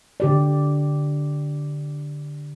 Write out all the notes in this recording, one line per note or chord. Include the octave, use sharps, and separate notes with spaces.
D3 G4 D5